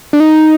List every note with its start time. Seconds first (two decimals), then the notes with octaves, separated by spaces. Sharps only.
0.13 D4
0.20 D#4